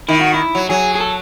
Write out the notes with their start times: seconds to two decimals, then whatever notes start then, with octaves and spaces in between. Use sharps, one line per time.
0.09 D#3 E4
0.21 F#4
0.34 E4
0.55 F#3
0.69 F#3 G#4
0.95 G#4
1.00 A4